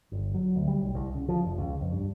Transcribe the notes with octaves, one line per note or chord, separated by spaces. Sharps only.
G1
F#3
D2
G3
B1
C2
C#3
F3
F1
C#2
F2
G2